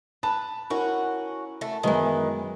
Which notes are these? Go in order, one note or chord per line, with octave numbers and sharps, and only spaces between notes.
B4 A5
C#4 E4 F#4 A#4
A3
F#2 D#3 E3 G#3 B3